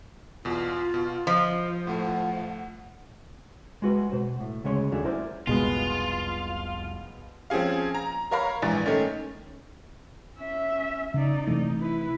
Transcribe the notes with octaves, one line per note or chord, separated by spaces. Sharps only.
E2 B2 F4
B2
F3 C5 D#5
A2 A3 F#5
G#3 F#4 B4
B2 C5
A2
D2 C#3 G#3 C#5 C6
D#2 F#3 A3 D4 G#4
E4 A#4 C5 D5
F1 C2 B2 G#3 B3 F4
F3 C4 C#4 G#4 F5
A#5
A#4 C#5 F5 A#5 B5 F6
A#1 G#2 E3 A6
D#3 A3 C#4
C#4 E5
C#3 D#4 D5
C3 E3 A3 D#4
E4 B4